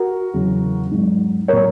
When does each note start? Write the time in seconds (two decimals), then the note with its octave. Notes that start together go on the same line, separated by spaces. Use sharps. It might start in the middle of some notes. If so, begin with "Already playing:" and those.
Already playing: F#4 A#4
0.34 E2 C#3 F#3
0.91 G#2 F#3
1.48 A#2 F#3 A#4 C#5